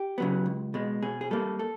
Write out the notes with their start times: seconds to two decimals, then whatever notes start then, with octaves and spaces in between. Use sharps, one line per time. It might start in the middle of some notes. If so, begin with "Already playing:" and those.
Already playing: G4
0.18 C#3 F#3 B3
0.46 C#2
0.74 B2 G#3
1.02 B2 G#4
1.21 G#4
1.31 G3 A#3 A4
1.59 A4